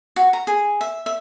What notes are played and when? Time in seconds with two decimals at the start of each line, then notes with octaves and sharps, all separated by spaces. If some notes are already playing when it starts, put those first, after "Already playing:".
0.16 F#4
0.33 A#5
0.47 G#4
0.81 E5
1.06 E5